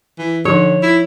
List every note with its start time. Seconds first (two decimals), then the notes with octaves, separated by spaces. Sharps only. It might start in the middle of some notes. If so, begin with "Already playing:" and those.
0.19 E3
0.45 D3 F3 D#4 C#5
0.82 E4